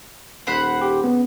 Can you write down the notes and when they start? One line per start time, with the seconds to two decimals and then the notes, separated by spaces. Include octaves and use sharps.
0.47 D#1 C5 F#5 B5
0.81 G4
1.04 C#3 B3